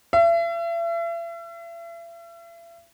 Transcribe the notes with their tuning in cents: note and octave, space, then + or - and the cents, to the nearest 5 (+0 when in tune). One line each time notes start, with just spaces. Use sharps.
E5 +40